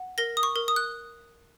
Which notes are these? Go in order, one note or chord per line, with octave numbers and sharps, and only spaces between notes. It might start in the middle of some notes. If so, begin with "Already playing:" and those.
Already playing: F#5
A#4 A#6
D#6
C#6
A#4
D#6
F#6